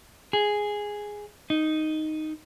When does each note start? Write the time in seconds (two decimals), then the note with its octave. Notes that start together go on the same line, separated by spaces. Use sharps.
0.33 G#4
1.50 D#4